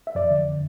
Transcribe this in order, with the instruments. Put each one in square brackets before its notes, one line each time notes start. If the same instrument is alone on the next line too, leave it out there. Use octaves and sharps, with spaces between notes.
[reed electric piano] E5
F2 D5
D3